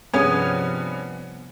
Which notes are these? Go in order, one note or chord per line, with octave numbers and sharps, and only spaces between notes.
G2 C3 F3 B3 C#4 G#4 C#5